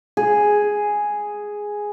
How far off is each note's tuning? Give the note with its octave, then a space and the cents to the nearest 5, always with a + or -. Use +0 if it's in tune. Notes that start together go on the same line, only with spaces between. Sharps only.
G#4 +0